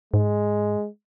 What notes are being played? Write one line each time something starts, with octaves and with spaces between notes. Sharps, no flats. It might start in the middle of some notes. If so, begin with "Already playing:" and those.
G#2 G#3